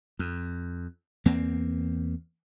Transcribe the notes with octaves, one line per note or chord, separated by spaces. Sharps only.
F2
E2 A#3 C4